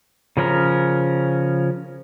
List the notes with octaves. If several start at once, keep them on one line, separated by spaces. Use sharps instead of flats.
C#3 F3 C#4 A#4